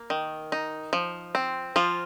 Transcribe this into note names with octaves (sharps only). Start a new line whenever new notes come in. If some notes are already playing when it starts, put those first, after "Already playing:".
Already playing: A#3
D#3
D#4
F3
C4
F3 F4